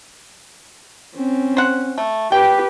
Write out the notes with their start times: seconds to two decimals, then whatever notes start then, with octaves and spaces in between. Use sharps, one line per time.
1.15 C4 C#4
1.57 C5 F#5
1.98 A3
2.32 G4 B4 G5